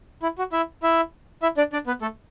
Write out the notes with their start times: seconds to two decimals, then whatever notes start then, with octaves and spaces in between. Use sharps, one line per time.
0.23 E4
0.38 F#4
0.52 E4 E5
0.83 E4 E5
1.43 E4 E5
1.57 D4 D5
1.73 D4 D5
1.87 B3 B4
2.02 A3 A4